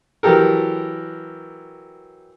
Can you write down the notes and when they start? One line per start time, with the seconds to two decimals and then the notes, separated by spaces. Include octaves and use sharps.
0.23 E3 F#3 G4 A4 A#4